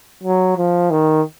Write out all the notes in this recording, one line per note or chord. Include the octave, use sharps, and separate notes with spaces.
F#3
F3
D#3